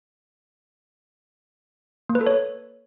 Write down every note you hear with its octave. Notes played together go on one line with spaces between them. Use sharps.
A#3
B4
A4
C#5